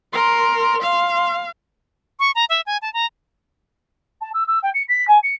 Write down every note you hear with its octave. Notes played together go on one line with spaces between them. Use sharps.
A#4 C6
F5
C#6
A#5
E5
G#5
A5
A#5
A5
E6
E6
G5
C#7
B6
G#5
C#7